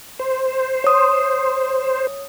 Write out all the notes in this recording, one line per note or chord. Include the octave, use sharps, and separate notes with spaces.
C5
C#5 D#6